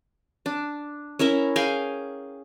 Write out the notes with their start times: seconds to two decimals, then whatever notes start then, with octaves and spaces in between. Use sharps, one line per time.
0.46 D4
1.19 C#4 E4 A#4 E5
1.56 G#4 F5 G5 G#5